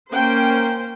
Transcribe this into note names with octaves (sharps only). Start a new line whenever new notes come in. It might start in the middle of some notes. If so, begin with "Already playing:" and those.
A#3 C#4 C5 G5